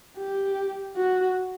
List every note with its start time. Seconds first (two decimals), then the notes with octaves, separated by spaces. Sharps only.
0.18 G4
0.96 F#4